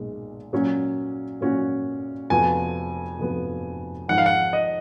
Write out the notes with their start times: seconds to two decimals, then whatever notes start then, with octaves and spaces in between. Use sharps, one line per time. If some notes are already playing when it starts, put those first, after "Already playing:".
Already playing: B1 A#2 G#3
0.53 A#2 F#3 C#4 F#4
1.41 A#2 F#3 C#4 F#4
2.30 F1 F2 F3 B3 F#4 G#5
3.19 F1 F2 F3 B3 F#4
4.08 G#1 G#2 F3 F#5
4.18 F5
4.26 F#5
4.53 D#5